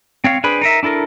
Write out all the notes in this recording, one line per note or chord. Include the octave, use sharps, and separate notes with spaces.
C4 C#5 F5
D4 G#4 B4 C5 B5
D#4 A#4 E5
D4 E4 A4 A#4